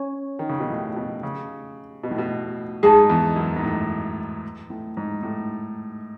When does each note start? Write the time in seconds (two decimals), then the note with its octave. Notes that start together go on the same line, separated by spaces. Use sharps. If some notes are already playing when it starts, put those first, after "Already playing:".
Already playing: C#4 C#5
0.39 D#3
0.49 C#3
0.60 B2
0.70 A2
0.96 B2
1.23 C#3
2.03 B2
2.11 A2
2.18 B2
2.83 G#2 G#4 D#5 A5
3.10 E2
3.36 F#2
3.56 G#2
3.64 A2
4.70 A2
4.97 G#2
5.23 A2